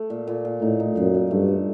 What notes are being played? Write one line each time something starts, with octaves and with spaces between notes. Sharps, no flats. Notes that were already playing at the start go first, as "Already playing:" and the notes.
Already playing: A3
A#2
A#2
A#2
A2 D#4
D#4
F#2 A#2
A#2
G2 A3
A3